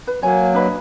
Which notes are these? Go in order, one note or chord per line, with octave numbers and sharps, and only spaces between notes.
B4
F#3 A#3 C#5 G#5
D4 B4 D#5